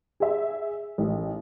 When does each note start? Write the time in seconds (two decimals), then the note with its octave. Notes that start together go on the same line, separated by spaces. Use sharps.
0.20 G#4 E5
0.98 A1